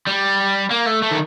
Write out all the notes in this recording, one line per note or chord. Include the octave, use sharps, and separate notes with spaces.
G3
A#3
A3
A3
D#3